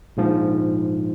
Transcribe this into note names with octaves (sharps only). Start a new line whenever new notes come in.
A#1 G#2 F3